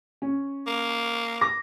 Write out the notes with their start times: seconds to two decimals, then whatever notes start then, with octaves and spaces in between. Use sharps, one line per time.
0.22 C#4
0.67 A#3
1.41 D6 A#6